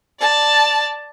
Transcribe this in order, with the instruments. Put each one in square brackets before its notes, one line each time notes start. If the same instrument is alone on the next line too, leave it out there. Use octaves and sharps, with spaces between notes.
[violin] D5 A5